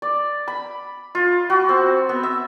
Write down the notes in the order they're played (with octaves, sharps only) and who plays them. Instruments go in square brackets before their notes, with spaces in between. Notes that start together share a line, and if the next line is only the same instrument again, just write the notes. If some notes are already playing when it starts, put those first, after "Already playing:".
[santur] D5
B5
F4
F#4
C4
B3
E5